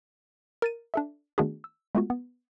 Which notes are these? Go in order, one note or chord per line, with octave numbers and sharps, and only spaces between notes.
A#4 A6 D#7
D4 A4 E5
D#3 A3 B3 D4 F#4 G#4
E6
G#3 A3 B3 F4 F#4
B3